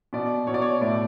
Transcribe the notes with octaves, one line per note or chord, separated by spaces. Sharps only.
B2 D5
B2 C#5
D5
C#5
A2 D5